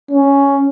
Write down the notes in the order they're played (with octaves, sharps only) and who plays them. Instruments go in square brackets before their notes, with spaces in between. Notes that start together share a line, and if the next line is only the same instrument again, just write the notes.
[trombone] C#4